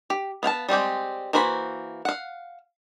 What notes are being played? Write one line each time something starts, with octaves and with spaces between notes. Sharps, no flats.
G4
B3 F5 G5 A5
G3 G#3 C4 G4
E3 A#3 F#4 C5 B5
F5 F#5